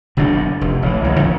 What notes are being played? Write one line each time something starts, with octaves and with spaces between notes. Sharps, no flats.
F#1 F#2 B2 D4
F1
A1 D#3 E3
G#1 C#2 G#2
D#3 F3 C4 C#4